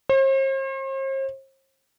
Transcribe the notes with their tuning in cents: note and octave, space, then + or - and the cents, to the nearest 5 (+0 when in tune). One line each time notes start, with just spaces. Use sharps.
C5 +45